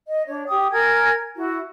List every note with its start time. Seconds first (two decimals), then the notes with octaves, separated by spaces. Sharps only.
0.07 D#5
0.27 D4 C#5
0.47 G4 G5 D#6
0.71 A#4 G#5 G#6
1.36 E4 F#4